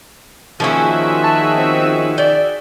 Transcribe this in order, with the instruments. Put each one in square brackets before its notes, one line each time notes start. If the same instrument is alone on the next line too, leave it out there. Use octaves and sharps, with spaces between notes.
[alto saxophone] D#3 [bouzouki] F3 A#3 C#4 [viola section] F#4 G#4 E5
[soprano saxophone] A5
C4
[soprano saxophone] D5 [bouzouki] G5